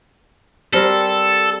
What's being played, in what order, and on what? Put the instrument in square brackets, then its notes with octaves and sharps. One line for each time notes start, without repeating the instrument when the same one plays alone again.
[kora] G3 C4 A#4 [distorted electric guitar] A4